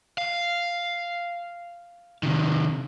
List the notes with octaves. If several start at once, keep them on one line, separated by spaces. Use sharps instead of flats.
F5
C3 D#3